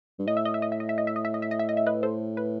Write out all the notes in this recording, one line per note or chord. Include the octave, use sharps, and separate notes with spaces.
G2
A2 D#5
E5
D#5
E5
D#5
E5
D#5
E5
D#5
E5
D#5
E5
D#5
E5
D#5
E5
D#5
E5
B4 D#5
A4 C5
B4